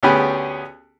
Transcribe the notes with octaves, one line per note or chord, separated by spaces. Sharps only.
D2 B3 C#4 G4 G#4 B5